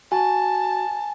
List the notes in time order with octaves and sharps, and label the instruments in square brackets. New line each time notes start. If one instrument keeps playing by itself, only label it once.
[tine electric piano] F#4 [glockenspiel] G#5 [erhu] A5